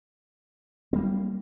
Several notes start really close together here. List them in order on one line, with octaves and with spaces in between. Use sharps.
C4 G3 A#3